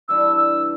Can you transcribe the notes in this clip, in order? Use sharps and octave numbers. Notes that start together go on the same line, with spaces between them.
E3 G3 D4 E6
E6